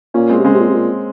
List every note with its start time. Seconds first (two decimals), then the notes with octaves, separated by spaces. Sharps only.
0.14 A#2 A#3 C#4
0.29 G#3 C4
0.39 C3
0.45 C#3 G#3 C4
0.54 C3
0.59 A#2
0.69 C3
0.74 A#2